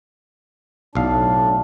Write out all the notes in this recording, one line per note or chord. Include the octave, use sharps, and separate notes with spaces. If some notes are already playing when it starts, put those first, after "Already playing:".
B1 A2 D4 F5